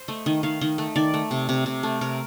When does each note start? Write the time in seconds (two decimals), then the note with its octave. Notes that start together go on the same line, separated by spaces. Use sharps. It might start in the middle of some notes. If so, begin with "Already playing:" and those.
Already playing: C5
0.08 A3 D#5
0.26 D#3 D#5
0.43 D#3 F5
0.61 D#3 D#5
0.78 A3
0.96 D#3 D5
1.14 A3
1.31 C3
1.49 C3
1.66 C3
1.83 A3
2.01 C3 A#4